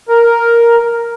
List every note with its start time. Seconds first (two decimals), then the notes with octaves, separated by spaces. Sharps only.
0.08 A#4